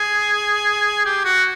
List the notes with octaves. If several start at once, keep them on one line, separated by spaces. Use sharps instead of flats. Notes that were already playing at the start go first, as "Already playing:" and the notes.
Already playing: G#4
G4
F#4